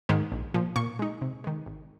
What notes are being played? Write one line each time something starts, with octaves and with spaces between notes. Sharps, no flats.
G#2 D#3 G#3
A#1
A#2 F3
A#2 C#6
G#3 D#4
C3
D#3 G#3
G#1